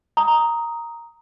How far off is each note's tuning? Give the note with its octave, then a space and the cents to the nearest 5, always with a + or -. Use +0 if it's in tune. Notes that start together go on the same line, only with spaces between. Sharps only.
A#5 +0 D#6 +10